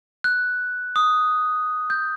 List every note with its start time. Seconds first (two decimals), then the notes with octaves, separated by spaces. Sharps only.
0.24 F#6
0.96 D#6
1.90 G6